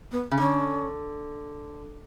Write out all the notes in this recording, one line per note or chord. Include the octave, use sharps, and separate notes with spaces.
B3
C#3
D3 C#4